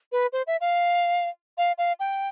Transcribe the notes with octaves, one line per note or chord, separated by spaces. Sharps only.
B4
C5
E5
F5
F5
F5
G5